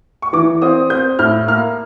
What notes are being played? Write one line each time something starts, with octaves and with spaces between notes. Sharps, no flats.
C#6
E3 D6
C4 D#6
C4 G6
A2 F6
A#3 F6